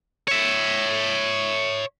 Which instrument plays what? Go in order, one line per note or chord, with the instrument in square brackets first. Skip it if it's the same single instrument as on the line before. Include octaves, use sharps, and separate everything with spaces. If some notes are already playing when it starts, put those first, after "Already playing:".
[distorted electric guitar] C#5 E5